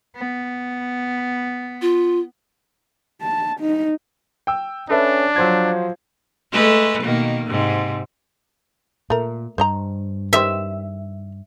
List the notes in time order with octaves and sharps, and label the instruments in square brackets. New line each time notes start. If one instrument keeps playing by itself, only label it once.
[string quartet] B3
[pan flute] F4
[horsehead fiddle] A5
D#4
[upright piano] G5 E6
[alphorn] C#4 [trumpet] D4 [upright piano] A4 B4 E5
[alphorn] F3 [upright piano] F#3 C5 G#6
[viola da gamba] G#3 A3 B4
B2 D#3 A#3
G#2 C3
[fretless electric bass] A#2 [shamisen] A3 A#4
[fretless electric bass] G2 [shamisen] C5 D#5 A#5
[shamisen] D#3 G3 C5 [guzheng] E5